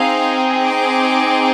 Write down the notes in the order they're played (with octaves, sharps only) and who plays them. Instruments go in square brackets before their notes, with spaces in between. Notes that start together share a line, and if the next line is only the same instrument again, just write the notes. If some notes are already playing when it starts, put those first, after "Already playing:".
Already playing: [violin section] C4 D#4 G#4 F5
D6